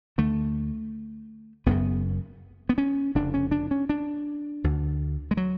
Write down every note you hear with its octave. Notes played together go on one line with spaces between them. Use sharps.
D2 D3 A3
F#1 F#2 C#3 B3
B3
C#4
F1 F2 C#3 D4
C#4
D4
C#4
D4
D2 D3
G#3
F#3